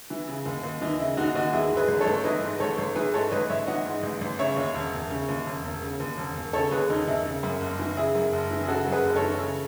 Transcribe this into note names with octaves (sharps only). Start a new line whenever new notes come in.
E3
C#3
D#2
D#2
E3 D#4
C#3 E4
D#2 D#4 F#4
D#2 D#4 F#4
E3 E4 G#4
G#2
G#4 B4
A1
A4 C#5
A1
E3 B4 D#5
G#2
A1 A4 C#5
A1
E3 G#4 B4
G#2 A4 C#5
A1 B4 D#5
A1 C#5 E5
E3 D#5 F#5
G#2
A1
A1
C#3 C#5 E5
D#2
E1
E1
C#3
D#2
E1
E1
C#3
D#2
E1
E1
C#3 A4 C#5
D#2 G#4 B4
E1 D#4
E1 E4
C#3
F#2
F#1
E3
C#3 E4 G#4
F#2
F#1
E3
G#4
C#3 F#4 A4
F#2
G#4 B4
F#1
A4 C#5
E3
C#3